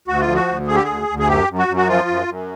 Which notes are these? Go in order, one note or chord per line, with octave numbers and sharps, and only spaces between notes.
D2 F#4
F4
F3
F#4
D2
D3 G#4
G4
D2 G#4
D2
G#4
F#2 G4
F#2
F#4
F#2
F#4
F3 F4
F#2
F#2